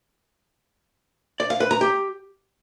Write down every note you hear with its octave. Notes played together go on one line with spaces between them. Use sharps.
D5
F5
B4
A#5
G4